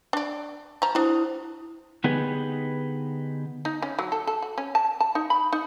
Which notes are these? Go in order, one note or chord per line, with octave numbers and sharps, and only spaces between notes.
D4 D5
F3 A#5
D4 E4 F#4 C5 D#6
D3 B3 D#4 G4 G#4 B4
D#4
C#4
F#3
A4
A4
F#4
C#4
A5
A5
D#4
B5
D#4